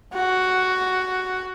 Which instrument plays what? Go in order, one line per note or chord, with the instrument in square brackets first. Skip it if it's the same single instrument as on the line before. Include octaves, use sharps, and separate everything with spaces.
[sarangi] F#4